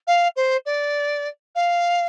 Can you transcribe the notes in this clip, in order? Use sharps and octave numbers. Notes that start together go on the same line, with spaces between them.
F5
C5
D5
F5